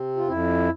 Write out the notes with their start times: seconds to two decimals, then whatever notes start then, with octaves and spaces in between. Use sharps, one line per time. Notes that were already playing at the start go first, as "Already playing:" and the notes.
Already playing: C3 C4
0.17 F4
0.28 F2 E4